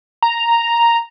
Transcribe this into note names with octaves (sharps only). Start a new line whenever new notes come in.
A#5